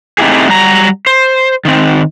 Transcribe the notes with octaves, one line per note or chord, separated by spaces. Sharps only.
A3 C4 D#4 E4 G4 G#4
F#3 G3 A#5
C5
D#3 C4